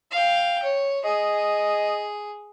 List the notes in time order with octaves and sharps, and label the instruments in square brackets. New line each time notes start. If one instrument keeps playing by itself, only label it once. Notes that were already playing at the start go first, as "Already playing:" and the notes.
[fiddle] F5 G5
C#5
[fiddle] G#4 [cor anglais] D#5